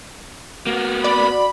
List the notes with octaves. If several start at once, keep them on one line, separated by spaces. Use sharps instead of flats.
A#3 B3 F#4
D5 B5